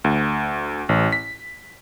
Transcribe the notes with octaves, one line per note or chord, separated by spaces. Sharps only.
D2
A1
B6